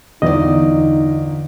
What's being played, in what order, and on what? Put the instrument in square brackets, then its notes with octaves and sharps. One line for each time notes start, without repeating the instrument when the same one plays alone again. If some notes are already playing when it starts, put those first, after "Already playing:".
[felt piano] G1 D5 [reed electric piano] E2 D#5 [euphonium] D#4